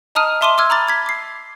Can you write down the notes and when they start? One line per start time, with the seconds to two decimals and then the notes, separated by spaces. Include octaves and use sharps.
0.15 D#5 A5 A#5 D#6 F6 D#7
0.41 E5 A5 C6 D6 D#7 G7
0.58 D6 E6 F6 G#6
0.70 A#5 B5 D6 A6
0.87 D6 G#6 B6
1.06 D6 C7